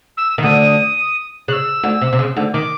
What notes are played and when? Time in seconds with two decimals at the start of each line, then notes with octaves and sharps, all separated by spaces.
0.17 E6
0.38 D#3
0.43 D2 D3 D#6
1.48 C#3 F#6
1.53 E6
1.83 D2 D3
2.01 C3
2.13 C3
2.19 C#3
2.36 D2 D3
2.54 D#3 D6